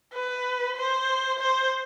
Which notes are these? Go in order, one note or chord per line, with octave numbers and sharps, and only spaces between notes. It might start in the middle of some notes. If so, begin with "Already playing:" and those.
B4
C5
C5